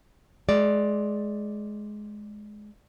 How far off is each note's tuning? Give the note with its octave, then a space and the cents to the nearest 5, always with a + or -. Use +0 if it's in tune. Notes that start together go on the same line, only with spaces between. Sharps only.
G#3 +15 D5 +0